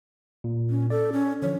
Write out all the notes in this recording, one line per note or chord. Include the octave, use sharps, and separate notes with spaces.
A#2
C#4
A4 D5
C#4
D3 F3 C#5